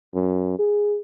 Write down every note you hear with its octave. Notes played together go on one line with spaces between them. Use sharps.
F#2
G#4